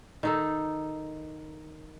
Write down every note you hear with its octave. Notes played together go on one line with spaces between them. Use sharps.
D#3 D#4 A4